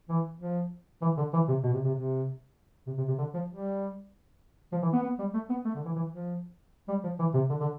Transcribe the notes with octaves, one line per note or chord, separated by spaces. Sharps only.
E3
F3
E3
D3
E3
C3
B2
C3
C3
C3
C3
C3
C3
D3
F3
G3
F3
E3
B3
B3
G3
A3
B3
A3
D3
E3
E3
F3
G3
F3
E3
C3
D3
D3